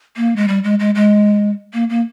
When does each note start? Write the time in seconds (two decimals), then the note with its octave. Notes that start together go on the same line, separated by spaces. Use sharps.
0.17 A#3
0.36 G#3
0.48 G3
0.64 G#3
0.80 G#3
0.95 G#3
1.73 A#3
1.90 A#3